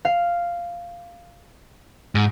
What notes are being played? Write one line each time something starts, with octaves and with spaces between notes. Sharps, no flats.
F5
G#2